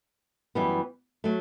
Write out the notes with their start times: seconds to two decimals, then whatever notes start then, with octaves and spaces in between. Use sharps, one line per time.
0.55 F#2 E3 G3 B3
1.24 F#3 A3